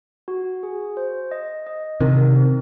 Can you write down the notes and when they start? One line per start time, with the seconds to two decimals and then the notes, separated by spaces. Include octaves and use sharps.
0.28 F#4
0.63 G#4
0.97 C5
1.31 D#5
1.67 D#5
2.00 C3 D#3 A#4
2.36 C4